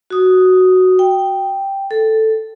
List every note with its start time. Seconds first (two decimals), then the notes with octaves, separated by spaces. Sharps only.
0.10 F#4 D#6
0.99 G5
1.91 A4